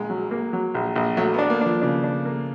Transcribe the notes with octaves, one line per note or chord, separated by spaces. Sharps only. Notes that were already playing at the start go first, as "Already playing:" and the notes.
Already playing: A#1 G#3
F#3
A#3
F#3
A#1
A#1
F#3 A3
B3
D4
A#3
F3 D4
C#3 D4
D4
A#3